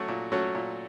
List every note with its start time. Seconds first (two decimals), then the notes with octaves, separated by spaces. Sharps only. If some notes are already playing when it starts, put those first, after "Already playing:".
Already playing: F#3 A3 C#4 F#4
0.08 A#2
0.32 F#3 A3 C#4 F#4
0.55 A#2